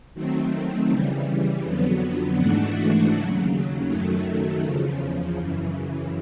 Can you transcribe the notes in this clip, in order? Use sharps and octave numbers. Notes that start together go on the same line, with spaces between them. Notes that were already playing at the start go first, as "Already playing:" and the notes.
D#3 F#3 A3 C4
C#3 E3 G3
F2 D3 F#3 B3
G#2 E3 A3 D4 F#4
D#2 C#3 F#3
F#2 D#3 F#3 A3
E2 C#3 F3
F#2 C#3 E3